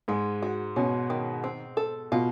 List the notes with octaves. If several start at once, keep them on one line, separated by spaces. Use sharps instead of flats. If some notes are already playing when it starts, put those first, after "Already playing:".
G#2 G#3
F#4
B2 C#4
D#3
C4
A4
B2 F4